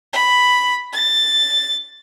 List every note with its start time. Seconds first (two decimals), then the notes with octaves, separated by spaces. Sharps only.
0.13 B5
0.93 A6